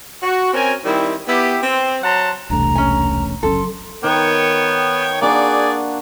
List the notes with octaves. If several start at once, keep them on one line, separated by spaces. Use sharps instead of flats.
F#4
C4 C#4 A#4 G#5
D#3 G3 C4 E4
B3 E4 G4
C4
F#3 F#5 A5 A#5 C6
E1 C2 A3 D4 A#5
C#4 G#5
F#1 D3 F#3 C#4 A4 C6
D#3 B3 C#5 G5
A#3 D4 F#4 G#4 D5